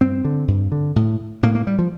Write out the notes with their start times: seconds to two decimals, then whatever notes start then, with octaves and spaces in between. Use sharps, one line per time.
0.01 G2 C4
0.25 D3
0.48 G2
0.72 D3
0.96 A2
1.43 A2 A#3
1.55 A#3
1.67 G3
1.79 F3